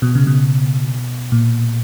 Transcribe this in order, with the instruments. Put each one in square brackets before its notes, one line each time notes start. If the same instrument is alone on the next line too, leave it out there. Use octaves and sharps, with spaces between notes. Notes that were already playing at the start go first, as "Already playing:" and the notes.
[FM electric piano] B2
C#3
B2
A#2